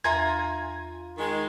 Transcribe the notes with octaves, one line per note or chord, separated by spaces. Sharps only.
E2 F4 E5 G#5 A#5 C6 G#6
D#3 G#3